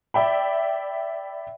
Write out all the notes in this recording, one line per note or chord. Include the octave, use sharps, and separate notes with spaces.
D5 E5 G5 B5